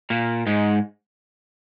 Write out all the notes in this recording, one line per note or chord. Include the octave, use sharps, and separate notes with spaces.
A#2 A#3
G#2 G#3